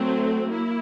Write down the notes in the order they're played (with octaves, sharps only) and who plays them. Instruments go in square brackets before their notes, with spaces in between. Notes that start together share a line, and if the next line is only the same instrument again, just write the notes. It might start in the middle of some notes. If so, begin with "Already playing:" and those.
Already playing: [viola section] F#3 A3 C4
A#3 E4